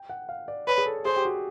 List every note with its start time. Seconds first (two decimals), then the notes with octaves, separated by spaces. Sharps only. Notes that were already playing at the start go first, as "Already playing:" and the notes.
Already playing: G5
0.09 F#5
0.29 F5
0.48 D5
0.67 B4 C#5
0.78 G#4
0.86 A4
1.05 G#4 C5
1.16 G4
1.25 F#4